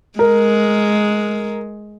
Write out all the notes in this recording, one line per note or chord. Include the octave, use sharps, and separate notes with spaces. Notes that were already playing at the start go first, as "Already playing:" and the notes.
G#3 A#4